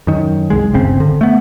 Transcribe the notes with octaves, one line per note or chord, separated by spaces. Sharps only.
F#2 D#3
C2 G#3
D1 G1 C#3 C4
D3
A3 B3